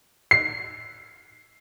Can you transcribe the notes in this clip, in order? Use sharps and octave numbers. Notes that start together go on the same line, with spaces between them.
C7